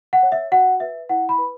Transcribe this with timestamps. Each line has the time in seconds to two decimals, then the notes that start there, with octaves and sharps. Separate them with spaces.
0.13 F#5
0.23 C#5
0.32 E5
0.52 F#4 F#5
0.80 B4 E5
1.09 E4 F#5
1.29 B5
1.38 B4